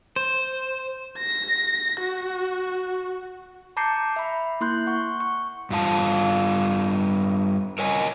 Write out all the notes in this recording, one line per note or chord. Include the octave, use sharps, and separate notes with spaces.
C5
A#6
F#4
A5 A#5 D6 G6 C7 C#7
E5 B5
A#3 E4 C6 F#6 G6
F#5 C#6
C#6
G2 F4 A5
A#4 C#5 D#5 G#5